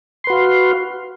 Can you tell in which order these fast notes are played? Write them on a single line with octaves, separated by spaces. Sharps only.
C6 B4 F#4 F5